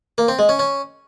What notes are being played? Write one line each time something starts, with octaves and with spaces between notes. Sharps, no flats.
A#3
C4
G#3
C#4
C#4